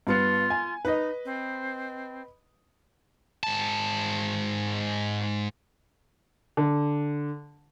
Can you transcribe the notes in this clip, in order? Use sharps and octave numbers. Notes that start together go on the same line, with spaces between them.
G2 B3 F4 C#7
G#5
D#4 B4 D#5
C4
G#2 A5
D3